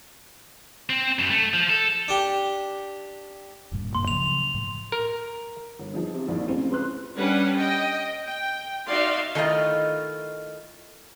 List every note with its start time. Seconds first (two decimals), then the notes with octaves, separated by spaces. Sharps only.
0.90 C4
1.19 F#2
1.30 A3
1.54 F3
1.70 A4
2.08 D4 G4
3.72 D#1 G2 A#2
3.95 D2 G2 A#3 C6
4.08 C#3 F3 F#3 F7
4.54 A2
4.92 A#4
5.79 G1
5.93 E2 F3 D#4
6.13 C3
6.28 A#1 D#2 A2
6.48 A1 C4
6.70 C#2 B4 C6 F#6
7.17 G3 C#4 D4 B4 F#5
7.54 D#5 G5
8.28 G5
8.88 D#4 F#4 D5 E5 F5 C6
9.35 D#3 A3 E4 F4 D#5